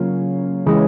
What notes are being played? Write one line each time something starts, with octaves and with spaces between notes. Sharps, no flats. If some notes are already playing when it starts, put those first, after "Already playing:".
Already playing: C#3 F#3 A#3 C#4 F4
C#3 E3 G#3